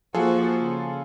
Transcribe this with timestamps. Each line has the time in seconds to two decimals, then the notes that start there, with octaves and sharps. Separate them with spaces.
0.15 F3 A#3 F4 F#4 G#4 A4
0.61 C#3